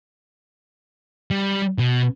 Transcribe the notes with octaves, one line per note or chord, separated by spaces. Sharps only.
G3
B2